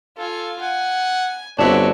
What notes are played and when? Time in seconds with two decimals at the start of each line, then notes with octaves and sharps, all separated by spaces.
0.17 F4 A4 G#5
0.61 F#5 G#5
1.58 G1 C4 D4 F#4 C#5 E5 F#5